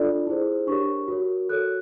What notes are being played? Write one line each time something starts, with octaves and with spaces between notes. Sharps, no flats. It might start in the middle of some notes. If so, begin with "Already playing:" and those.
Already playing: D4 F4 A4 D5
E4 G#4 C5
D4 G4 A#4 C#5 C#6
F#4 A#4 C#5
F#4 A4 C#5 F#6